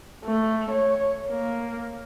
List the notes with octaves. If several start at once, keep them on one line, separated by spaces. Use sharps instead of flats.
A3
C#5
A#3